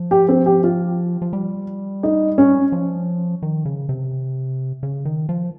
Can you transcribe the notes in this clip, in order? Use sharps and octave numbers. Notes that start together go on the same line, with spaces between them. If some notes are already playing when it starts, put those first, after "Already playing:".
Already playing: F3
G4
C4
G4
F4
F3
G3
D#4
C#4
F3
D#3
C#3
C3
C#3
D#3
F3